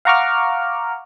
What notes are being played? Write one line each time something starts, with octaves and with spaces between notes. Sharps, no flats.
F5 F#5 A#5 C#6 D6 F6